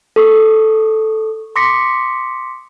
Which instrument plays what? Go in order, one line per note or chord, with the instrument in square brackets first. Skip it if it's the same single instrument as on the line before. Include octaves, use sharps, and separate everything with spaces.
[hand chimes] A4 C#6 D#6
C6 D6 D#6 A#6 B6 C#7